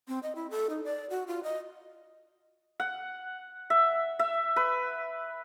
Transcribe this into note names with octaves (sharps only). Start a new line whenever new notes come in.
C4
D#5
E4
A4
D#4
D5
F#4
F4
D#5
F#5
E5
E5
B4